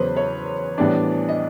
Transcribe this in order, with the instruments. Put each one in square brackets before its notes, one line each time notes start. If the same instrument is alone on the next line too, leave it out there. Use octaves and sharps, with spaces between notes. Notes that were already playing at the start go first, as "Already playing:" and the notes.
Already playing: [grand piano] E2 C#3 F#3 B3 [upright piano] B4 C5
[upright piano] C#5
[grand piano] A2 E3 G3 B3 D4 [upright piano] D5
[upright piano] D#5